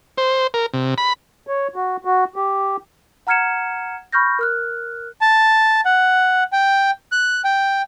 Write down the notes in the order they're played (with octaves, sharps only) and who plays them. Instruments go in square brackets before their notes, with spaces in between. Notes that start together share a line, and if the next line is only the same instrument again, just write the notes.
[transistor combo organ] C5
A#4
C3
B5
[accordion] C#5
F#4
F#4
G4
[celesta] F#5 A#5 F6 G#6 C#7 E7
B5 C#6 F6 G6 A#6
A#4 F6 F#6
[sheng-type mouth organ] A5
F#5
G5
F#6
G5